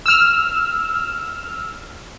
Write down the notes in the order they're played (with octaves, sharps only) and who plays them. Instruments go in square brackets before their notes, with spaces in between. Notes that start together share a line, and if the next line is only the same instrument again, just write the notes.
[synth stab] E6 F6